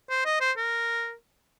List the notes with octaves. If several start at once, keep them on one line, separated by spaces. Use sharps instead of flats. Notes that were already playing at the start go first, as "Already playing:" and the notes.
C5
D#5
C5
A#4